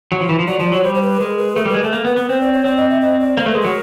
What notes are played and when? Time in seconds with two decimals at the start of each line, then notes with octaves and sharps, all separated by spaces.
0.12 F#3
0.21 F3
0.29 E3
0.39 F3
0.48 F#3 D5
0.59 F3 D5
0.72 F#3 C#5
0.84 G3 C5
0.95 C5
1.02 B4
1.20 G#3 A#4
1.38 B4
1.56 A3 A#4
1.65 G3 B4
1.74 G#3
1.81 A#4
1.84 A3
1.92 A#3 A#4
2.05 B3 B4
2.16 B3 B4
2.29 C4 C5
2.41 D5
2.53 C#5
2.64 C4 D5
2.77 D#5
2.89 E5
3.01 D#5
3.19 D5
3.37 A#3 C5
3.46 A3
3.50 B4
3.55 G#3
3.61 F#3 A#4